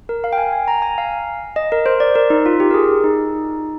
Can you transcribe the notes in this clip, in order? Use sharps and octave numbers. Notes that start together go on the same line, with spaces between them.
A#4
F5
G5
G#5
G#5
A#5
G#5
F5
D#5
A#4
C5
D5
A#4
D#4
F4
G4
A#4
G#4
D#4